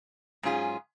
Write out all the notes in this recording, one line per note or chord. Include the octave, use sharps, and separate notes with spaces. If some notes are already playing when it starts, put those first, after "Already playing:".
G#2 F#3 C#4 F4 G#4